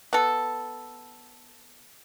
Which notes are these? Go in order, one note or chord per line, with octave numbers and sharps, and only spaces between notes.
B3 A4